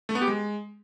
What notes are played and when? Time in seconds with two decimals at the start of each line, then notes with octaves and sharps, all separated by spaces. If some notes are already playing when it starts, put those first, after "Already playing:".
0.09 A3
0.15 B3
0.21 G4
0.28 G#3